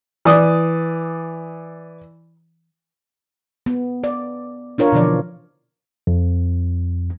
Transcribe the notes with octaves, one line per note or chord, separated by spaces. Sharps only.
E3 D5 D#6
B3
D5
D4 F4 A#4 C#5
B2 D3 E3 F3 D5
F2